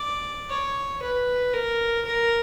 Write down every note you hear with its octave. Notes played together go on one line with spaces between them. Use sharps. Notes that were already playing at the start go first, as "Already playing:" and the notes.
Already playing: D5
C#5
B4
A#4
A#4